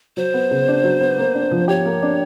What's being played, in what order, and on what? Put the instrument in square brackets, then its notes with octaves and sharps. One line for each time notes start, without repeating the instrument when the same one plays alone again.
[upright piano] F#3 [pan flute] C5
[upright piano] B3
C#3
D4
F#3
B3
A#3
D4
F3
[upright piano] G4 [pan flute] C#5
[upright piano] A#3
D4